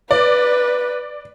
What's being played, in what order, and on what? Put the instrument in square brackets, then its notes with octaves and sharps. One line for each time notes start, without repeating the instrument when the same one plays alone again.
[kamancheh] B4 [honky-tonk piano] D5